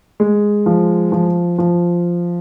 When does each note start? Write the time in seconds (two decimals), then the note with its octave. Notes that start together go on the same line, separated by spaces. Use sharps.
0.20 G#3
0.66 F3
1.12 F3
1.58 F3